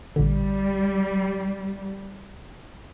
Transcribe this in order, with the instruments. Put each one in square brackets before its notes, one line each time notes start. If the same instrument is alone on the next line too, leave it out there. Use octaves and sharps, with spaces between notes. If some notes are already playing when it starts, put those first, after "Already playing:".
[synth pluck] A1 A#2 D3 [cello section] G3